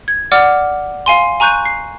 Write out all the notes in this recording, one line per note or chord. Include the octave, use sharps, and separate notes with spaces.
G#6
D5 F#5 D6 F6
F5 G#5 C6
G#5 A#5 C#6 F#6 G6 D#7
C7